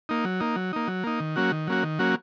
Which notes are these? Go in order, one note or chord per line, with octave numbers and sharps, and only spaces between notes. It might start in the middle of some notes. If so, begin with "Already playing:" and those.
A#3 D#4
F#3
A#3 D#4
F#3
A#3 D#4
F#3
A#3 D#4
D#3
F#3 A#3 C#4 F#4
D#3
F#3 A#3 C#4 F#4
D#3
F#3 A#3 C#4 F#4